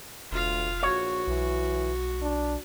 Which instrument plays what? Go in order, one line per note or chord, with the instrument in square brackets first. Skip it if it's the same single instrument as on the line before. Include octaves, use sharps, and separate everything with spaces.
[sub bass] F1 [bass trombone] D2 [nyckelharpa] F4 F5
[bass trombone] A#1 [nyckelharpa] F#4 [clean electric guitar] C#5
[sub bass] B1 [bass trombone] E3
[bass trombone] D4